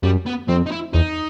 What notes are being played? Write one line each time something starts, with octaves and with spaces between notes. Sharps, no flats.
F#2 G3
B3
F2 C4
D#4
E4
E2 D#4